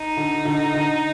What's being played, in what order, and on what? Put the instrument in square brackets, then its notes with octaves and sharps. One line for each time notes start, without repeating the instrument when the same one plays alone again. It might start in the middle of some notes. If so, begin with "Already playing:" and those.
Already playing: [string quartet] D#4
[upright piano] D3
D3
D3